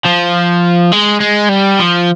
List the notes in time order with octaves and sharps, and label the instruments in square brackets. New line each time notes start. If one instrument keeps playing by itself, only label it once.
[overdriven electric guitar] F3
G#3
G#3
G3
F3